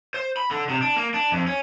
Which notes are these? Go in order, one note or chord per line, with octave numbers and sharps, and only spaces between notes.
C5
B5
D3
C3
D4
A#3
D4
F2
C#4